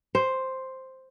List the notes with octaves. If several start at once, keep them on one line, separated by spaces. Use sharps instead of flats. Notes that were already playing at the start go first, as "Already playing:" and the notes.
C5